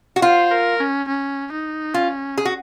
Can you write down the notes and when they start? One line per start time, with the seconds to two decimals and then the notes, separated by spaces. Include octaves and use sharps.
0.16 F#4
0.22 F4 C5
0.51 A#4
0.80 C#4
1.08 C#4
1.52 D#4
1.94 C#4 F4
2.38 G#4
2.45 F#4